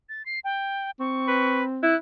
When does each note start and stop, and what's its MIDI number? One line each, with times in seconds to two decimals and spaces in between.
0.09 0.25 93
0.26 0.40 96
0.44 0.91 79
1.00 1.98 60
1.00 1.58 85
1.28 1.64 71
1.83 1.96 64
1.83 1.96 90